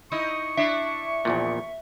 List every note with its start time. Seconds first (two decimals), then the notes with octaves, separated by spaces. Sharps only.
0.12 D#4 E4 D#5 C#6
0.57 D4 E4 E5
1.25 A#1 E2 A#2